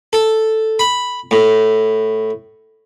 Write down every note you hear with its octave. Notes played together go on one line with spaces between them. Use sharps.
A4
B5
A2